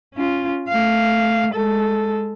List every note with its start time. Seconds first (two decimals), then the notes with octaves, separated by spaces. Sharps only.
0.15 C#4 F4
0.69 A3 F5
1.54 G#3 A4